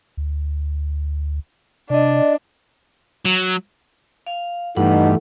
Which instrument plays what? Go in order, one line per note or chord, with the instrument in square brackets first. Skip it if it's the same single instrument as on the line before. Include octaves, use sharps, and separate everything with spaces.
[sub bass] D2
[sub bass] C3 [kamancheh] D4 [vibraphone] D5 D#5
[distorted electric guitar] F#3
[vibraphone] F5
[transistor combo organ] G2 [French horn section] B2 D#4 [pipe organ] E3 A3 [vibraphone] F#5